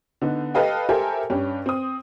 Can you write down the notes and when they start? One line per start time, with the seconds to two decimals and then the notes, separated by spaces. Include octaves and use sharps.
0.21 D3 B3 D#4
0.54 G4 A4 B4 D#5 F5 G5
0.89 G4 A4 A#4 C5 E5 G#5
1.30 G2 C#4 G4
1.66 C4 D#6